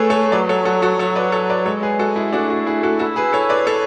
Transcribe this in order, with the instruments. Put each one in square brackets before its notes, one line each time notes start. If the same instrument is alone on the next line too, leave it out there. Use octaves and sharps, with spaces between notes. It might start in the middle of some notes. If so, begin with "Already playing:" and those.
Already playing: [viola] A3 [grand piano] G#4 A4 B4 C#5
[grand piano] A4 C#5
[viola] F#3 [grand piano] B4 D5
[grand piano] A4 C#5
F#4 A4
F#4 A4
[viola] F#3 [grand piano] A4 C#5
[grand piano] B4 D5
A4 C#5
B4 D5
[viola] G#3 [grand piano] A4 C#5
[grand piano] G#4 B4
F#4 A4
E4 G#4
[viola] A3 [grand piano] D4 F#4
[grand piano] D4 F#4
E4 G#4
F#4 A4
[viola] E4 [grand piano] F#4 A4
[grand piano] G#4 B4
A4 C#5
B4 D5
A4 C#5